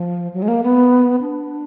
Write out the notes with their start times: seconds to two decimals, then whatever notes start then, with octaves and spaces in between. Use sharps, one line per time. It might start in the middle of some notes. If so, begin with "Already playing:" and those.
Already playing: F3
0.34 F#3
0.42 G#3
0.48 A#3
0.64 B3
1.21 D4